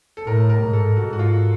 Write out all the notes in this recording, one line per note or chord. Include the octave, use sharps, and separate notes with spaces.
A4
A2 A#4
A#4
G#2
A4
G#2 F#4
F#4
F4